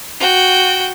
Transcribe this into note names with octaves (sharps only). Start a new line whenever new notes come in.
F#4 G5